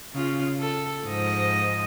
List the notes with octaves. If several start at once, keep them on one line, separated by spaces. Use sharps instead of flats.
C#3 F4
A4
G#2 F3 D#5